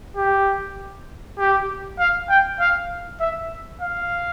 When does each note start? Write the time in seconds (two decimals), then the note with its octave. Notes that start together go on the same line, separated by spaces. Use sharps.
0.17 G4
1.39 G4
1.99 F5
2.29 G5
2.60 F5
3.20 E5
3.81 F5